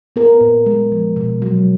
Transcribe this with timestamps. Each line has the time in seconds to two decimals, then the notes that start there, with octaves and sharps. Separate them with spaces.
0.16 B3 A#4
0.41 A#2
0.66 G#3
0.92 F3
1.16 B2
1.42 F#3